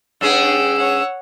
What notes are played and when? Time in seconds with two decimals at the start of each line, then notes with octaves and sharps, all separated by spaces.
0.21 G2 C#4 G#4 F#5 G5 E6
0.76 C#5 F#5